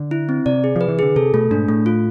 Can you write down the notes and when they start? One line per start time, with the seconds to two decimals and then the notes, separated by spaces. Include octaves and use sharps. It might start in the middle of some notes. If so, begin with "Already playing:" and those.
Already playing: D3
0.11 E4
0.29 C4
0.46 C3 D5
0.64 G#4
0.76 F3
0.81 B4
0.88 E3
0.99 D3 G#4
1.16 C3 A4
1.34 B2 A3
1.51 G#2 D4
1.69 A2 A3
1.86 F4